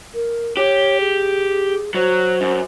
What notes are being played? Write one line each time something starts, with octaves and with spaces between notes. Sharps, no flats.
A#4
G4 C#5
G#4
F#3 C5
F#2